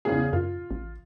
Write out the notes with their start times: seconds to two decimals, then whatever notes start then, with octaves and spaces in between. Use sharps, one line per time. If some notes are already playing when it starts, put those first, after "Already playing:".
0.05 E2 C#3 G#4
0.33 F#2 F4
0.71 A1